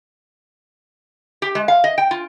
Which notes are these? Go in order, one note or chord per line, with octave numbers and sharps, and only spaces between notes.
G4
G#3
F5
D#5
G5
F4